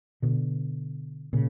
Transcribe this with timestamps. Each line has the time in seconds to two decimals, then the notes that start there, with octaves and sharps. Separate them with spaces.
0.22 B2 D3
1.33 A#2 C#3